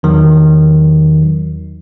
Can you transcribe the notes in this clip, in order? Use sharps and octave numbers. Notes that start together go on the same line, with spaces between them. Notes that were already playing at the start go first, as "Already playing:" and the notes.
E2 D#3 F#3